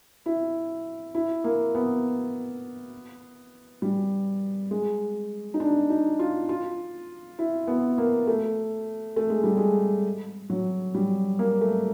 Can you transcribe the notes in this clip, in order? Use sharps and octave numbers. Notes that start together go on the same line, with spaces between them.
E4
E4
A#3
B3
G3
G#3
D#4
D4
D#4
F4
F4
E4
B3
A#3
A3
A3
G#3
G3
G#3
F#3
G3
A#3
A3